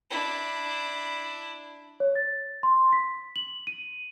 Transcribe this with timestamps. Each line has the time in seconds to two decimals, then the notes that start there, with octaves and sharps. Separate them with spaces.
0.10 D4 E4
2.00 C#5
2.15 A6
2.63 C6
2.93 B6
3.36 F#7
3.67 D#7